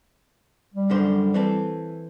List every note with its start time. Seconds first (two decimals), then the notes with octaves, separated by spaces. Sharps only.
0.74 G3
0.90 F#2 D3 C5
1.34 E3 C4 A4